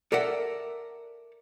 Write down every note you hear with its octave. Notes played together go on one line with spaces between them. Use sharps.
A4 A#4 D5 E5 F#5